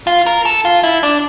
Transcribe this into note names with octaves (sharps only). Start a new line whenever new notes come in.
F4
A#4
A4
F4
E4
D4